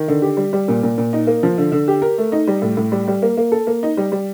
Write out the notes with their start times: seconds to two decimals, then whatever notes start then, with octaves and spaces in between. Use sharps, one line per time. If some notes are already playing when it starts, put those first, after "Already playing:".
Already playing: D#3
0.08 D3
0.22 G4
0.37 G3
0.53 G3
0.68 A#2
0.83 A#2
0.98 A#2
1.13 D#4
1.27 A#3
1.43 F3
1.58 D3
1.72 D3
1.88 G4
2.02 A#4
2.18 A3
2.32 D#4
2.47 G3
2.62 A2
2.77 A2
2.92 G3
3.08 G3
3.22 A#3
3.37 A#3
3.52 A4
3.67 A#3
3.83 D#4
3.97 G3
4.12 G3